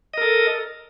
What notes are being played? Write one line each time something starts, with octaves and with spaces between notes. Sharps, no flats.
A4 A#4 D#5